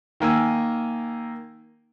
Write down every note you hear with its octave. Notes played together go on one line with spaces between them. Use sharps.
D#3 A#3 G#5 E6